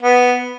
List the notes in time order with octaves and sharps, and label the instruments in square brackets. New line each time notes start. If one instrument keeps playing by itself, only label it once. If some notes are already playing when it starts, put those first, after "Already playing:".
[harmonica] B3